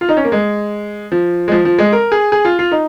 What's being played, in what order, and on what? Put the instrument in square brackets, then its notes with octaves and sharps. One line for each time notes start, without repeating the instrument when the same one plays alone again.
[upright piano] F4
D#4
C#4
A#3
G#3
F3
G#3
F3
F3
G#3
A#4
G#4
G#4
F4
F4
D#4